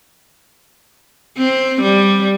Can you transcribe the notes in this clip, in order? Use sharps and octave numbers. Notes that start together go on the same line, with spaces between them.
C4
G3